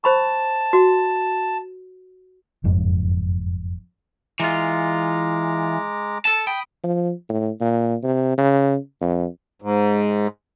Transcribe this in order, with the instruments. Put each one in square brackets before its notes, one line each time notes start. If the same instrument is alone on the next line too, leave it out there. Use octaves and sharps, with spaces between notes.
[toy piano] C5 B5 C#6 [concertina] A5
[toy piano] F#4
[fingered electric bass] F#1 F2 G#2
[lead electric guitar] E3 F4 [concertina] G#3 A#5 D6
[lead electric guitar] A4 A5
[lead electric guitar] G5 [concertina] B5 D#6
[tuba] F3
A2
A#2
C3
C#3
F2
[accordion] G#2